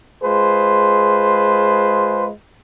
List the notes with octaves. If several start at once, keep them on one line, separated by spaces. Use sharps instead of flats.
G#3 F4 G#4 B4 C5